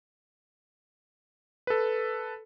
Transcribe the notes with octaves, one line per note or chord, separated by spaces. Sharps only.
A4 B4